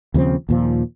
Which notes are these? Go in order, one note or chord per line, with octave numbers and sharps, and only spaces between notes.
D#2 C#3 F3 C4
D#2 A#2 F3